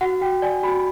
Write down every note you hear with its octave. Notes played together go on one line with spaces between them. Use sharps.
F#4 F#5
F#4 G5
D5 G#5
F#4 B5